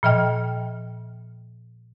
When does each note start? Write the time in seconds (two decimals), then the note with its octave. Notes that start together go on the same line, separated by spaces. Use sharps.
0.03 A#2 F3 D#5 G5 F6